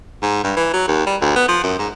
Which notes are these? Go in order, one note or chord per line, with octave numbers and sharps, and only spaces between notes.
G#2
G2
E3
F#3
D#2
G3
D2
B3
F3
F#2
G#2